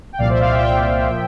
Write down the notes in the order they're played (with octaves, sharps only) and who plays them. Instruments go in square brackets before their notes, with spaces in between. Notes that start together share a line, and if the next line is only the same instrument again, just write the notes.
[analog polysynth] G5
C2 A#2 F3 D5 F5
C5 E5
D5 F5
E5 G5
E5 G5
A#2 F3